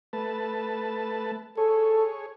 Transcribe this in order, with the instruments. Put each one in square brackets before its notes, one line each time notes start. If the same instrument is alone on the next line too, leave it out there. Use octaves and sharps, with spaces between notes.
[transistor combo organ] A3 B4 A5
[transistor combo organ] G#4 C#5 [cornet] A4